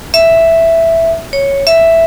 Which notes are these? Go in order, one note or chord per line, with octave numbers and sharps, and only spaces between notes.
E5
C#5
E5